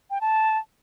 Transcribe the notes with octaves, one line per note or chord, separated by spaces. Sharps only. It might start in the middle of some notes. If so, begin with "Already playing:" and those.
G5
A5